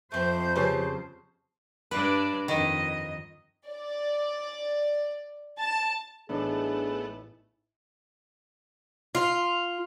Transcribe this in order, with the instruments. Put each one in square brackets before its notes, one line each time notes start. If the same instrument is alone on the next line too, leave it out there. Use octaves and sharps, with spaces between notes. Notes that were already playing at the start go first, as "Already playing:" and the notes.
[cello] F2 C5 [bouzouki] A3 C4 [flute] G6
[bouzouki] C#3 C4 A5 [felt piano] G3 C#4 B4
[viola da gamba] G2 D4 D5 [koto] B4
[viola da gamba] F2 D#5 [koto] D#3
[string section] D5
A5
[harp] A1 D#4 C#7 [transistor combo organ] A3 B3 [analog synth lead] D4 [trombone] G#4
[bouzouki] F4